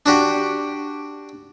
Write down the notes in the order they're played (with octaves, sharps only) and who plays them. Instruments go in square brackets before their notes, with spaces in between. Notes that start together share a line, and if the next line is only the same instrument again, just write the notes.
[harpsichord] D4 F#4 G4